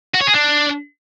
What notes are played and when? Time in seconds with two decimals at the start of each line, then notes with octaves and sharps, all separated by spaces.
0.15 F#4
0.21 C#5
0.28 G#4
0.34 D4